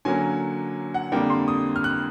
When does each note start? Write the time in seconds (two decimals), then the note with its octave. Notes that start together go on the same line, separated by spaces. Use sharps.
0.05 D3 F#3 A#3 C#4 G#5
0.94 F#5
1.12 F2 D3 G3 A#3 D4 G5
1.30 C6
1.48 D#6
1.76 F6
1.84 F#6